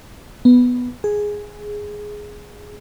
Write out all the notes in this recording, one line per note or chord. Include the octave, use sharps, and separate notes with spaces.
B3
G#4